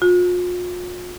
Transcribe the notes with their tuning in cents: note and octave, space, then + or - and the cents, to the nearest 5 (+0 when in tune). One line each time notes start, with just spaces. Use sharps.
F4 +40